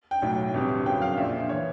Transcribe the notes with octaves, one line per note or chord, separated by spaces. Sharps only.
G5
B1 A2 F#3
G1 F2 C3
F#1 F2 C#3 F#3 G5
F5
A#1 A#2 F3 E5
E3 C#5